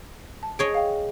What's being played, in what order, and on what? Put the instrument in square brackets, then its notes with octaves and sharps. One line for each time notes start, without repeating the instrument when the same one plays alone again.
[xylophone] A5
[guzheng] G#4 C#5 D#5 [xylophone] D7
[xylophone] F5 G5